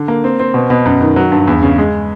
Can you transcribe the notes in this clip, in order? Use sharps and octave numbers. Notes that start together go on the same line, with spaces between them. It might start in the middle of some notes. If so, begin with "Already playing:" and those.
Already playing: D3
A#3
C4
C4
B2
B2
F#2
D#3
F#3
G2
E2
C#3
G#3